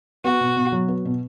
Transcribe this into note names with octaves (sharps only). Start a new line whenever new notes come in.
B3 F#4
B2
B2
F#3
B3
B2